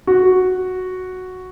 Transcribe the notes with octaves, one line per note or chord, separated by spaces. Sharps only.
F#4